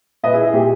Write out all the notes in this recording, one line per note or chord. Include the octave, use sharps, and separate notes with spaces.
A#2 B4 D#5
E4 G#4
E4 G#4
A#2 G4